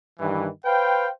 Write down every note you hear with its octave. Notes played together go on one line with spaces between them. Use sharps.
G2 D#3 E3
B4 C5 F5 G5